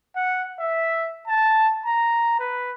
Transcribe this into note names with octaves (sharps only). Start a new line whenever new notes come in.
F#5
E5
A5
A#5
B4